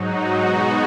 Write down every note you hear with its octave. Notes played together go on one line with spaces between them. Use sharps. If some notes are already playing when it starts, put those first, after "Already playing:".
Already playing: G#2 F#3 D#4 F#4
B2 G#3 B3 D#4 F#4